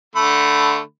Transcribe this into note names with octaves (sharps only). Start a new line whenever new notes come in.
D3 A3 B5